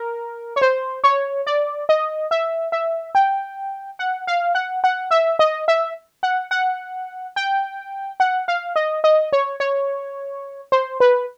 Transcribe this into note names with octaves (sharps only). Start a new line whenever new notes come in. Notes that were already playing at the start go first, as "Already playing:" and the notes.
Already playing: A#4
C#5
C5
C#5
D5
D#5
E5
E5
G5
F#5
F5
F#5
F#5
E5
D#5
E5
F#5
F#5
G5
F#5
F5
D#5
D#5
C#5
C#5
C5
B4